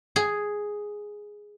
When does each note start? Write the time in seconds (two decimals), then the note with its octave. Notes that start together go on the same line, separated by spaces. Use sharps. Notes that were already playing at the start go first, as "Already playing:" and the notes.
0.16 G#4